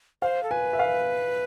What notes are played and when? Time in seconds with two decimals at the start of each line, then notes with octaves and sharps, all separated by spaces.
0.22 C5 F5
0.43 A4
0.51 B4 G#5
0.73 E5
0.79 F5